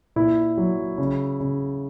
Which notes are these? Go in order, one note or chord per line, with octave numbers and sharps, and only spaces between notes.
A#2 E4
F#3
C#3
C#3